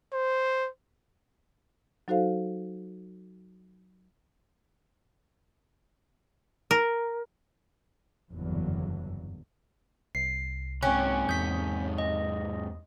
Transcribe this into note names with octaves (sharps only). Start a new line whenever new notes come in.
C5
F#3 D#4 F#4 A4 C5 F5
A#4
F#1 E2 G2 D3 E3 F#3
C2 C7
G#2 C3 C#4 G5 C#6 F#6
E2 D#6 G6 B6
D#5